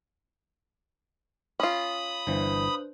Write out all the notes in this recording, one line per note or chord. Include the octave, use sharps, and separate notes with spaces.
C#4 F4 B5 D#6
G1 E3 D4 B4 C5